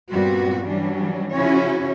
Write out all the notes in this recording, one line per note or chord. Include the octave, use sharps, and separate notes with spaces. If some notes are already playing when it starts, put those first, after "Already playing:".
G2 A#2 G3 B3 C4 F#4
E3 F#3 G3 C#4 D4
C#3 F3 C#4 E4 F#4 C#5